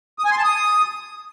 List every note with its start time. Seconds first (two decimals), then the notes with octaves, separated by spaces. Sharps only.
0.19 D#6
0.25 G#5
0.31 C6
0.38 A5
0.44 D#6